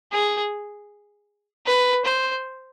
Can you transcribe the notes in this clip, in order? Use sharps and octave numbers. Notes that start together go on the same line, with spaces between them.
G#4
B4
C5